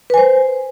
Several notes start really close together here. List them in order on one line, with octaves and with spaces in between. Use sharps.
B4 G#5 C5